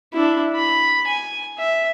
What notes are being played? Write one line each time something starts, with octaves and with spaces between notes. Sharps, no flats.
D4 E4
B5
G#5
E5